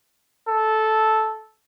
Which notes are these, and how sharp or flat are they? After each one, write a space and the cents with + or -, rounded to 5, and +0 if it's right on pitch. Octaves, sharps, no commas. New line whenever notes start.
A4 -10